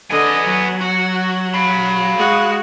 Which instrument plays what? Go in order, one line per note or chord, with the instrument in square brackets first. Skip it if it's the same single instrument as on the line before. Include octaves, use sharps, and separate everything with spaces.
[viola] D3 D#5 [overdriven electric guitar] B3 G#5
[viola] F#3
[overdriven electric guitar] F#4
F5 B5
[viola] G#3 F#4